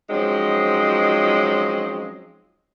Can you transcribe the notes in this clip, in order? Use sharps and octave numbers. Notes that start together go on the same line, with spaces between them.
F3 F#3 G#3 C4 C#4 D#4